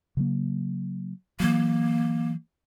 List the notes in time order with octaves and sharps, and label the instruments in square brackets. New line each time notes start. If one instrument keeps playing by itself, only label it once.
[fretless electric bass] C#3 F#3 A#3
[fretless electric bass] E3 F#3 [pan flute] A#3